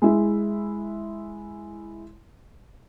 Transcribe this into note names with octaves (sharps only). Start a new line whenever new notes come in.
G#3 E4